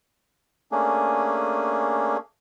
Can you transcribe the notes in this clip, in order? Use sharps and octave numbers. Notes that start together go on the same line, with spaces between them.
A3 A#3 C#4 D4 G#4